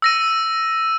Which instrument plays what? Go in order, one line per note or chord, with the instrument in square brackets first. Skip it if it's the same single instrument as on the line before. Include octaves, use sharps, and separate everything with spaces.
[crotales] E6 A#6 D#7